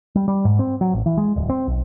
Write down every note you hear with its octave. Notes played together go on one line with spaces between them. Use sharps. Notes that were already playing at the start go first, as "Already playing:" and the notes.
G3
G3
G#2
C4
F#3
A1
E3
G#3
D1
C4
B1